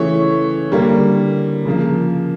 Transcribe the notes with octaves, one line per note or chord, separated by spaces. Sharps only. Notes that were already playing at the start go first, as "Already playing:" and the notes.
Already playing: C#3 E3 A3 C#5
D3 G3 A#3
C#3 F3 A#3